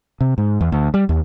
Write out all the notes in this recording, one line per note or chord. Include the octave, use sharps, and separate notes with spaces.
C3
G#2
E2
D2
G3
D#2